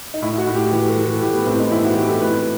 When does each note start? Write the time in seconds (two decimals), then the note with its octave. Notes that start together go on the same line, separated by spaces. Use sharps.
0.14 D#4
0.22 A2 E4
0.38 F#4
0.47 A2
0.55 G4
0.71 E3 G4
0.88 A4
0.97 E3
1.05 A4
1.22 A2 G4
1.34 B3
1.46 A2 C4
1.60 D#4
1.71 E3 E4
1.85 F#4
1.96 E3 G4
2.09 A4
2.21 A2 B4